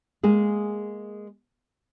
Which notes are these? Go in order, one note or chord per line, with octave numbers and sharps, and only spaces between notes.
G#3 A#3 G#4